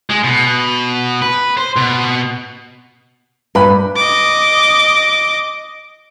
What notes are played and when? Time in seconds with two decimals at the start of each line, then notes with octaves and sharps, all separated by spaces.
0.10 G#3
0.24 B2
1.22 B4
1.57 C5
1.76 B2
3.55 G2 B4 B5
3.96 D#5 D6